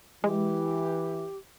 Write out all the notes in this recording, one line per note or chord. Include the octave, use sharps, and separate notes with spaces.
E3 G#3 G4